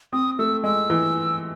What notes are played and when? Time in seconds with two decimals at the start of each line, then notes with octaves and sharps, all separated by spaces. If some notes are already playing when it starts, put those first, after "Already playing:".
0.13 C4 D#6
0.39 A3 E6
0.64 G#3 E6
0.90 E3